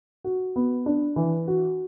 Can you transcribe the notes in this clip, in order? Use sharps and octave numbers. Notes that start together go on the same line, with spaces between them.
F#4
B3
D4
E3
F#4